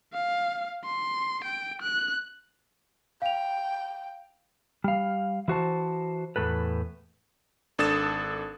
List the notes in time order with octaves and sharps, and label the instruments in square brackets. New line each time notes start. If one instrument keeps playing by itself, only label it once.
[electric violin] F5
C6
G5
F#6
[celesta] F5 F7 [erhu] G5
[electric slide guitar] G3 F5
E3 F#4 C5 A5
E2 A2 A4 B4
[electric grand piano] G#1 D4 A4 D#6 A6 E7